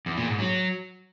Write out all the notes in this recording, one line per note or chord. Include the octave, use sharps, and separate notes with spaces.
E2
A#2
G#2
F#3